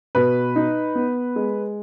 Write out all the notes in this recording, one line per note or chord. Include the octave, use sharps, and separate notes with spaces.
B2 B4
D#4
B3
G#3